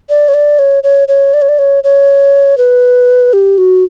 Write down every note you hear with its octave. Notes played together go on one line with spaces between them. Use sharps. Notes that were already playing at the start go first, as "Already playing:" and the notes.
D5
C#5
D5
C#5
C#5
C#5
D5
C#5
D5
C#5
C#5
B4
G4
F#4